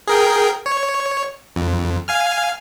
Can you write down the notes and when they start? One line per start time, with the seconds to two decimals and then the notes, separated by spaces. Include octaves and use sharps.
0.07 G#4 A#4 G5
0.66 C#5
1.56 F2
2.08 F5 G#5 F6